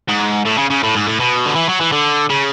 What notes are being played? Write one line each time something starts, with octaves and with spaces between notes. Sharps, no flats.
G#2
A2
C#3
C#3
A2
G#2
A2
B2
D3
E3
F#3
E3
D3
C#3